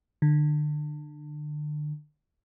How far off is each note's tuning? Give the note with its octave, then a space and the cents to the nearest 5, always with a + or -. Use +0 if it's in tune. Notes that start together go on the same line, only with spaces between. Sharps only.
D3 +30